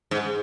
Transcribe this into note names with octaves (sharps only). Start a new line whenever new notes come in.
G#2